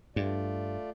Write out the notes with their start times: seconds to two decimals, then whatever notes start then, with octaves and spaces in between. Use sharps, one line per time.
0.16 G2 A3 F4 D5